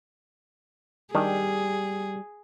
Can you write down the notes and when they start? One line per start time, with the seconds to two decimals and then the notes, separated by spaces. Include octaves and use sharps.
1.15 D#3 G3 D4 G4 G#4